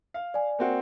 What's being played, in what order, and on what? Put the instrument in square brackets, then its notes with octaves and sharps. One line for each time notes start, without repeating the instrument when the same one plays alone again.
[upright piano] F5
[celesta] D5 G#5
[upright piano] A#3 C4 F#4